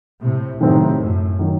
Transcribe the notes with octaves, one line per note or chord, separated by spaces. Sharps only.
A2 C3
A2 C3 D#3 F#3 A3 C4 D#4
F#2 A2
D#3 F#3